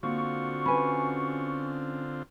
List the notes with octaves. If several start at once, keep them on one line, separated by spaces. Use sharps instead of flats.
D3 A#3 C4 F4 F#4 C#6
C#4 B4 G#5 B5